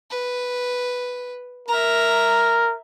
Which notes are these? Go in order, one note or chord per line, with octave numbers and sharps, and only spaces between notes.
B4
A#4 E5 A#5